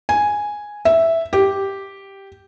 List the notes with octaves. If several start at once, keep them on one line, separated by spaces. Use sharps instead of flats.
G#5
E5
G4